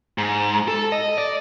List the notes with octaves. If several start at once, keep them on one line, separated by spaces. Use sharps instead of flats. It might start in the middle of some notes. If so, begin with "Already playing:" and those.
G#2
A4
D#5
D5